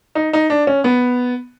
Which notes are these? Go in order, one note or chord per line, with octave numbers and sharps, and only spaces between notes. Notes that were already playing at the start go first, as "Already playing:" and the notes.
D#4
D#4
D4
C#4
B3